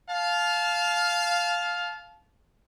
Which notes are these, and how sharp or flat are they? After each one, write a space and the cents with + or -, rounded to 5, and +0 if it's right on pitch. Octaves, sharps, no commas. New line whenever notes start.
F5 +5 A5 -25